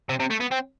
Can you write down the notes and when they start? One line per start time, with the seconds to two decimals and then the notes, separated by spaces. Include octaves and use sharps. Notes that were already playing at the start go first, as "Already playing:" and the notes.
0.09 C3
0.20 C3
0.30 A3
0.40 B3
0.51 C4